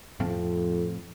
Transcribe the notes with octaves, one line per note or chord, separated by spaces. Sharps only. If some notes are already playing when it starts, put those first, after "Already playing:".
F2 A2 F3 C4